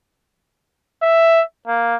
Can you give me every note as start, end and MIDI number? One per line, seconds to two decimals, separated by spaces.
1.03 1.43 76
1.67 1.96 58